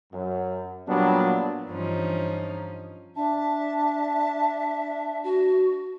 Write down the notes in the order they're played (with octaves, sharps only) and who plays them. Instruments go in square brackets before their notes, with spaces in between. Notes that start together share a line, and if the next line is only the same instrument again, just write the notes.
[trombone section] F#2
A#2 F#3 G3 B3 D4
[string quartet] G2 E3 F3 C#4 D#4
[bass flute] D4 [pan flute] E5 [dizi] A5
[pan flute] F#4